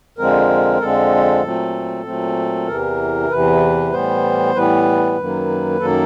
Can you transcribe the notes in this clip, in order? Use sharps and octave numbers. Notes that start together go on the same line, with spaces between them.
F2 D3 F3 G#3 C4 A#4
F2 D3 F3 G#3 C4 A4
A#2 F#3 A3 C4
A#2 F#3 A3 C4
E2 C3 E3 A#4
E2 C3 E3 B4
A2 E3 G3 B3 C5
A2 E3 G3 B3 B4
F#2 D#3 F#3 A#3
F#2 D#3 F#3 A#3 A4